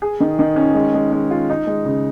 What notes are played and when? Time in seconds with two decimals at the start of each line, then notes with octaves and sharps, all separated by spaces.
0.02 G#4
0.20 D#3
0.39 D#3
0.56 C#4
0.75 G#3
0.94 G#3
1.12 G#3
1.31 F4
1.50 D#4
1.67 G#3
1.85 C#3